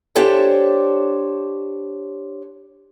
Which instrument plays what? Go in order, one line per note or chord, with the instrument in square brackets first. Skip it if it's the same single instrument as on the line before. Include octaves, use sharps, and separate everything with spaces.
[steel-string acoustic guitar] D4 G4 A4 C5 C#5 E5